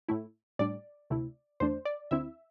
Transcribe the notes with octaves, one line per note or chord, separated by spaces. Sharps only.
A2 A3 E4
A2 G3 D4 D5
D2 C3 A3 E4
E2 D3 A3 D4 C5
D5
D2 D3 C4 E4 E5